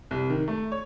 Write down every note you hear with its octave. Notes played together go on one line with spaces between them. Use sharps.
C2
D#3
A3
C#5